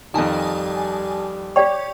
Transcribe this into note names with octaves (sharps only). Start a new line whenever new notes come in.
F2 D#3 G3 G#5 A5 D#6
G4 C#5 D5 G5 C#6